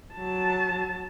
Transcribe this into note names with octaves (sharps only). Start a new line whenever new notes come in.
F#3 A5